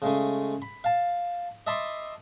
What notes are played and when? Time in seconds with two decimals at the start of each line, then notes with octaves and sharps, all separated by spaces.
0.02 C#3 G#3 A3
0.62 B5
0.84 F5 A5
1.67 D#5 E5 A5 B5 C6 D6